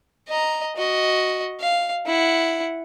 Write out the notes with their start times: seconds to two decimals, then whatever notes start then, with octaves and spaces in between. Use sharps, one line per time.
0.28 D#5 A#5
0.76 F#4 D#5
1.60 F5
2.06 E4 F#5